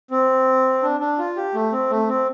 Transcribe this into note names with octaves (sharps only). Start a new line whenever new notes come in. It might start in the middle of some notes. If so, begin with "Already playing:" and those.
C4
D4
D4
F4
G4
A3
C4
A3
C4